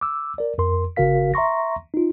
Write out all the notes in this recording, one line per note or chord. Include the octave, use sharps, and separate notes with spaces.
D6 E6
A#4 D5
F2 A#4 C6
G1 C#3 F#4 A#4 F5 B6
E5 A#5 C6 C#6 A#6
D#4 F4